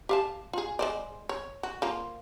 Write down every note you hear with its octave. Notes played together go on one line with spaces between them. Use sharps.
G4 F5 A5
F4 G#4
G#3 C5 D5
C#5
F#4
F3 A#3 F4